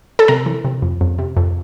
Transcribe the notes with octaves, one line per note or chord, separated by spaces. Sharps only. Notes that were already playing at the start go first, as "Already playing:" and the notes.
A4
C3 A#4
E3
C3
F2
F2
C3
F2